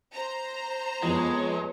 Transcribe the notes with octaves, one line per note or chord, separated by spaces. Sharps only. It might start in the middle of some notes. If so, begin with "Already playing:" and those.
C5 A#5
F2 F3 G#3 B3 C#5